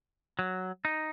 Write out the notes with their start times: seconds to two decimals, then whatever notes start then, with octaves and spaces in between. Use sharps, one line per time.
0.39 F#3
0.85 D#4